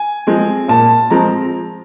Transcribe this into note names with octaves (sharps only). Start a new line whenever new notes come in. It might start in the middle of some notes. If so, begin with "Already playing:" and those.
Already playing: G#5
F3 G#3 C4
A#2 A5
F3 G#3 C4 A#5